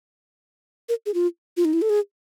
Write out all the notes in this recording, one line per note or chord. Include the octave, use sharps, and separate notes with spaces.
A#4
G#4
F4
F4
D#4
E4
A4
G#4